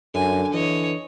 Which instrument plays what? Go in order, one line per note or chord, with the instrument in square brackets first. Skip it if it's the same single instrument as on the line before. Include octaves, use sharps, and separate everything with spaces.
[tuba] F#2 [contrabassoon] D3 [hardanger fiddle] G#5
[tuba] E3 [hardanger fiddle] C#5 D#5